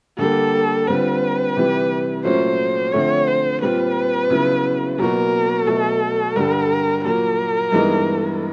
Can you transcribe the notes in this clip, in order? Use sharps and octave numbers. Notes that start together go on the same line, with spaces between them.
D3 G3 A#3 A4
D3 G3 C4 F4 B4
C3 E3 G3
A#2 F#3 A3 C#4 C5
D3 F3 A3 C4 C#5
C5
A#2 G3 C4 F4 B4
C#3 F#3 B3 E4
B2 F#3 A#3 A#4
B2 F#3 A3 A4
G2 D3 G3 A#4
A#2 F#3 A#3 A#4
G2 E3 G#3 B3 D#4